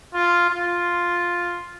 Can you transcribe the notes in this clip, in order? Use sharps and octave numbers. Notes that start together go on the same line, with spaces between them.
F4
F4